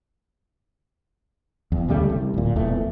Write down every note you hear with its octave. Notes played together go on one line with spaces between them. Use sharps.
E2
D2 C#3 G3 A3
C2
D1 A#2
E1 E2 E3 A3